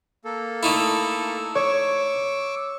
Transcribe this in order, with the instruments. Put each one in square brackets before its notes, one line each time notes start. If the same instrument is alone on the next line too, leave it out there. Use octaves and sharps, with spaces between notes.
[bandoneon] A#3 A4
[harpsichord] A3 D#4 E4
[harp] C#5 [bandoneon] C#6 D6 E6